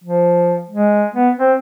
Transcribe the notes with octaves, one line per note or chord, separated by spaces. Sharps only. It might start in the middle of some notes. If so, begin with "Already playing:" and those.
F3
G#3
B3
C4